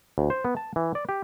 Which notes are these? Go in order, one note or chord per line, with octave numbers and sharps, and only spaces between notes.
D2
C5
B3
A5
E3
D5
G4